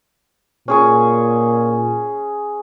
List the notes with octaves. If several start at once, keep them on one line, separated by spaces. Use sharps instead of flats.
A#2 C#4 G#4 C#6